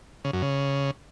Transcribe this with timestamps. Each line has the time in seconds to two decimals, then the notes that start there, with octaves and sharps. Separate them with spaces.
0.25 C#3
0.33 F#2
0.42 C#3